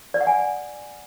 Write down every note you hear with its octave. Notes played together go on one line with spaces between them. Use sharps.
D5
F#5
G#5